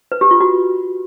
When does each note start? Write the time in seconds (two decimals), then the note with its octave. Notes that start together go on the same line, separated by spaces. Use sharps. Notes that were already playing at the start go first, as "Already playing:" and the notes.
0.12 B4
0.21 G4
0.31 F4
0.40 F#4